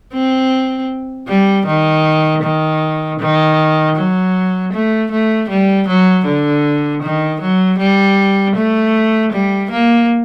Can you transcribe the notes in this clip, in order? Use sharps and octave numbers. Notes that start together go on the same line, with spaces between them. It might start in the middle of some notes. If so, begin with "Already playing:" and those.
C4
G3
D#3
D#3
D#3
F#3
A3
A3
G3
F#3
D3
D#3
F#3
G3
A3
G3
A#3